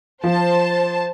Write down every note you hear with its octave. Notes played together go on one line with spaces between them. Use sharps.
F3 C5 A5